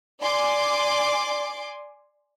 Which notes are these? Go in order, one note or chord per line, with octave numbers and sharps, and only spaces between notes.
D5 G#5 C6 D6